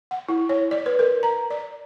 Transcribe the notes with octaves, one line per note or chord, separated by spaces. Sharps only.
F#5
E4
C#5
D5
B4
A#4
A#5
D5